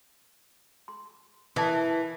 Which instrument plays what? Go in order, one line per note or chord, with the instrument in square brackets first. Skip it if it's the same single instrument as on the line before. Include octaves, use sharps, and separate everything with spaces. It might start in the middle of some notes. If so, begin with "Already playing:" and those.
[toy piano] C6
[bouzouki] E3 [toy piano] A#4 A5 D#6